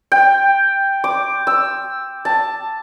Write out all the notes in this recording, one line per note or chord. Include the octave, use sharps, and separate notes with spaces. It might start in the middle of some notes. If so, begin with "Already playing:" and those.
G5
D6
E6
A5